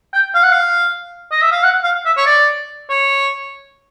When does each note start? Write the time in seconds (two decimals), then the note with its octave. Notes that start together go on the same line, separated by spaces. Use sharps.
0.13 G5
0.35 F5
0.43 F#5
0.52 F5
1.31 D#5
1.41 E5
1.52 F5
1.63 F#5
1.84 F5
2.06 E5
2.17 C#5
2.26 D5
2.90 C#5